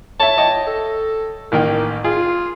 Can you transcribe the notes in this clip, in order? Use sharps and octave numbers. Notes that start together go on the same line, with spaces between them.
C#5 E5 A5
C#5 D#5 G5
A4
A1 D#3 A#3 G5
F4 G#4